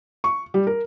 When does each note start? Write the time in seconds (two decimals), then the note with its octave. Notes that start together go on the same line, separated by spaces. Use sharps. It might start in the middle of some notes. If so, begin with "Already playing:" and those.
0.24 C#6
0.54 G3
0.67 A#4